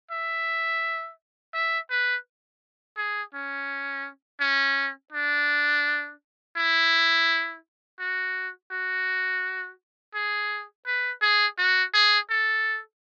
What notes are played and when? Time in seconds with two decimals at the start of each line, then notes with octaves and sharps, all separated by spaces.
0.11 E5
1.54 E5
1.90 B4
2.97 G#4
3.34 C#4
4.40 C#4
5.12 D4
6.57 E4
7.99 F#4
8.71 F#4
10.15 G#4
10.87 B4
11.22 G#4
11.58 F#4
11.94 G#4
12.30 A4